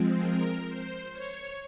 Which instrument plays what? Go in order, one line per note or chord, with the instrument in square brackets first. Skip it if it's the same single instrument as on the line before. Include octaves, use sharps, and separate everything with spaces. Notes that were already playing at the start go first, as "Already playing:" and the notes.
Already playing: [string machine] F3 G#3 C4
A#4
C5
C#5